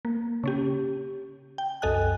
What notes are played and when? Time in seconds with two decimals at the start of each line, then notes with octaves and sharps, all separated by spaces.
0.05 A#3
0.44 C#3 C#4 G4
1.58 G5
1.82 C2 F#2 A4 D#5 G#5 F#6